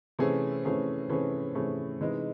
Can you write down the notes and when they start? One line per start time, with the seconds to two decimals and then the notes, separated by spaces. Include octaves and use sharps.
0.19 C3 E3 A3 C#4 G#4
0.65 C3 E3 A3 C#4 G#4
1.09 C3 E3 A3 C#4 G#4
1.55 C3 E3 A3 C#4 G#4
2.01 C3 E3 G#3 D#4